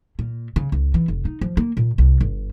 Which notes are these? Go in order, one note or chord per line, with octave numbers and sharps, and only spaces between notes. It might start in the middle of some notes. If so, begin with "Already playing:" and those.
A#2
C#3
C#2
E3
F1
D#4
F3
A#3
A#2
C2
G1